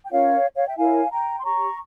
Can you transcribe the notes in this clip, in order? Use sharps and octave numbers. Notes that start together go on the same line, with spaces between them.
G5
C#4 F4 A#4 C#5 F5
C#5 F5
E5 G5
E4 A#4 C#5 F5 G#5
G5 A#5
C6
G4 C#5 A#5 C#6